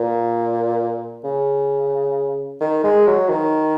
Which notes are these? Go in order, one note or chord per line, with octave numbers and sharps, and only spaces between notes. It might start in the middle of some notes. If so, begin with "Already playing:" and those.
Already playing: A#2
C#3
D#3
G#3
F#3
D#3